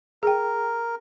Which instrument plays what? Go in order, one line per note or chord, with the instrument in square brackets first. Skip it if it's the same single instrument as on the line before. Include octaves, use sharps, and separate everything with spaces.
[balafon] G#4 G5 [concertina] A#4